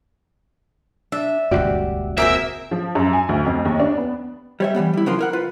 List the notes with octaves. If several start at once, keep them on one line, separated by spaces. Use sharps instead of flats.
D4 E5
D#1 C#2 F#2 F#4 G4 D5
A#3 C4 F#4 G#4 A#4 E5
F3
F#2
G#5
D2
F2
D#2
D4
B3
G3 C#5 E5
E3 F3 G3 B3
G3 E4
C#3 F3 F#3 F4 A#4 C6
E4 A#4 F#5
F4 B4